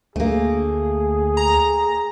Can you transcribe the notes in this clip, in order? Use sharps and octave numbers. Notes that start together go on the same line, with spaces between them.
D2 A3 A#3 G#4
A#5